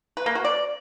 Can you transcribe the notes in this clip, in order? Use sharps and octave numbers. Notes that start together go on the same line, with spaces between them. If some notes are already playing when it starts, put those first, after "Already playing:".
B4
A#3
F#4
D5